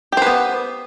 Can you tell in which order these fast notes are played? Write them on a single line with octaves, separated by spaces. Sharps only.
G4 C5 B4 B3